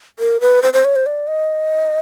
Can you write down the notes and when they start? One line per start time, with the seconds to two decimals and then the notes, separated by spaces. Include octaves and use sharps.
0.19 A#4
0.41 B4
0.62 C5
0.73 C5
0.85 C#5
0.96 C5
1.06 D5
1.27 D#5